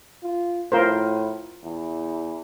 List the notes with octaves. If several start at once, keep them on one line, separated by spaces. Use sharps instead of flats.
F4
A2 F4 A#4 C5
E2